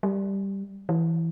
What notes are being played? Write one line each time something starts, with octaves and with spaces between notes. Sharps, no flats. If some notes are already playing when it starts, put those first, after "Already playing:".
G3
E3